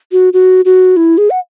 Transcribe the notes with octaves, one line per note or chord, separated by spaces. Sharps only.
F#4
F#4
F#4
E4
G#4
F#5